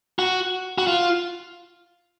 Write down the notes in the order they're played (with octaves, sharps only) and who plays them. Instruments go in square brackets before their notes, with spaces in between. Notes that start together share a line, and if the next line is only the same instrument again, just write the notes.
[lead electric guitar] F#4
F#4
F4